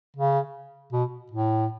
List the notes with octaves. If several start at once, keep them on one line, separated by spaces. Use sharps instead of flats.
C#3
B2
A2